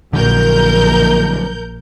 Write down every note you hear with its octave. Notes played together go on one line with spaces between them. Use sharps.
A#1 D3 F#3 A#4 G6